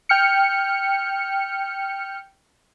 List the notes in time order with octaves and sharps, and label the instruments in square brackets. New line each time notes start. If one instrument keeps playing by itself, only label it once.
[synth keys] G5 F6 C#7